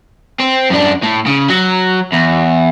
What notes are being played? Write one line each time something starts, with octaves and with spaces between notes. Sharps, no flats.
C4
F#2 D4
A2
C#3
F#3
E2